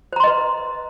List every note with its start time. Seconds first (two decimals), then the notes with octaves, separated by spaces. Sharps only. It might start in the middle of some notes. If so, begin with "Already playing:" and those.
0.13 C5
0.16 A#5
0.20 C6
0.24 D#5
0.27 B4